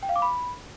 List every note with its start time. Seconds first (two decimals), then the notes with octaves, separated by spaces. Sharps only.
0.03 G5
0.09 F5
0.16 D6
0.22 B5